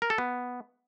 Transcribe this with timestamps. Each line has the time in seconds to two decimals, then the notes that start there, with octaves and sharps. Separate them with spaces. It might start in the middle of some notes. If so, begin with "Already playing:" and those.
0.02 A#4
0.10 A4
0.18 B3